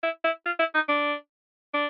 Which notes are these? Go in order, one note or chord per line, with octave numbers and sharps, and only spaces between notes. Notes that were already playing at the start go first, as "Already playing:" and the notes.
E4
E4
F4
E4
D#4
D4
D4